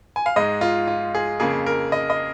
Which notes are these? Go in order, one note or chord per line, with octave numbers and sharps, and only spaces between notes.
G#5
F5
G#2 G#3 D#5
F4
F4
G#4
F2 C#3 A#3 G#4
A#4
D#5
D#5